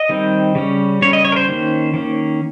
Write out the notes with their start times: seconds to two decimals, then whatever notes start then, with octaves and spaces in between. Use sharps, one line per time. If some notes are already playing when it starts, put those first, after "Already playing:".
Already playing: D#5
0.09 D#3 G3 C4
0.55 C#3 G3 C#4
1.02 C#3 G3 C#4 C#5
1.13 D#5
1.25 C#5
1.32 A#4
1.36 C5
1.48 D#3 A#3 C#4
1.94 D#3 A#3 C#4